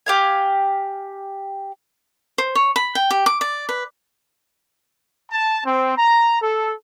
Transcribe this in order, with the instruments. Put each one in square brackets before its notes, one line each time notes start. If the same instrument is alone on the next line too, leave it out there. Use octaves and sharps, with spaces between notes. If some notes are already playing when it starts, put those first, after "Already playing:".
[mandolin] G4 F5 G#5
[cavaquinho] C5
C#5
B5
G5
G4
D6
D5
B4
[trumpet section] A5
C4
A#5
A4